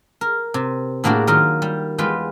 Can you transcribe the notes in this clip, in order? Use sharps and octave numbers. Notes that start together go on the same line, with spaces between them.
A#4
C3
A2 G#3 A#3 D4 F#4 D5
D#3 F#3 F4 A#4
G3
E2 G#3 F4 B4 G5